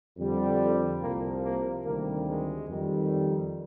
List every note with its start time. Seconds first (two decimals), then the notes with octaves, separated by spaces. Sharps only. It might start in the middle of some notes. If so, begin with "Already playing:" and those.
0.17 F2 D3 G3
1.01 C2 C3 F3 A#3
1.43 A#3
1.85 D2 C3 D#3 G3 A#3
2.27 G#3
2.69 F2 D#3 G3